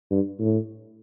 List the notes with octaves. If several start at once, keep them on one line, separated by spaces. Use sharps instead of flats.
G2
A2